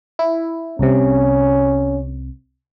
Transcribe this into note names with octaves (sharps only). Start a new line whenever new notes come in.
E4
C2 C3 C#4